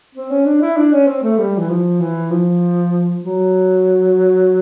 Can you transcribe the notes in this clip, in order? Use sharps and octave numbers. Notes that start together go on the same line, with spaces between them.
C4
C#4
D4
E4
D4
C#4
C4
A3
G3
E3
F3
E3
F3
F#3